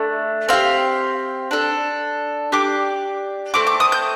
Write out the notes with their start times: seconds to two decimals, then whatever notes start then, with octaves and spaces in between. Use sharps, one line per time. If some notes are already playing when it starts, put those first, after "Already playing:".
Already playing: A3 D4
0.49 C4 G4 F5
1.51 D4 A4
2.52 D4 G4 D6
3.54 A3 C4 A4 D6
3.67 D6
3.80 D#6
3.92 G6